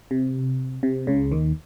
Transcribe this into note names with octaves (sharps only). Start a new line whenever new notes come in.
C3
C3
C#2 C#3
D#2 D#3